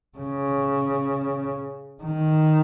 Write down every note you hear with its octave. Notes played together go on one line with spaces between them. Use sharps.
C#3
D#3